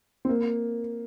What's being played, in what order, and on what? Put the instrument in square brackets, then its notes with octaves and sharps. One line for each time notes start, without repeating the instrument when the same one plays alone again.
[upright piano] C4
A#3